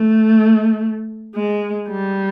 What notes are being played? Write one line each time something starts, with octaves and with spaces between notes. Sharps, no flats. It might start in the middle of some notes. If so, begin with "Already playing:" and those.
Already playing: A3
G#3
G3